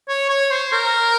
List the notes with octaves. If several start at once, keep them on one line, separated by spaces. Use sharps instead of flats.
C#5
C#5
C5
A#4